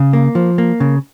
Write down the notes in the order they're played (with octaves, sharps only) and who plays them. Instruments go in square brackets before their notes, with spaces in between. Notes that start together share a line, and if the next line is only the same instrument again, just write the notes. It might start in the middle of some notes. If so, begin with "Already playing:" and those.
Already playing: [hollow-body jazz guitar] C#3
A#3
F3
A#3
C#3